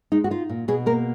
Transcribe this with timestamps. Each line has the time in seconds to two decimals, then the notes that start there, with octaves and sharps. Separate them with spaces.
0.12 G#3 D#4
0.24 F#4
0.31 D#4 F4
0.49 A#2
0.68 B2 G#4
0.86 A#3 A#4